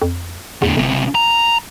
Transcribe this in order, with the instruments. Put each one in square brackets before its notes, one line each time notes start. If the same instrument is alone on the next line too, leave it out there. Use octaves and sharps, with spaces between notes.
[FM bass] F2
[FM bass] E2 [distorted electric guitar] A2 D3
[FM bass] G1 [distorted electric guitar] C#2 C3
[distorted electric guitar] A#5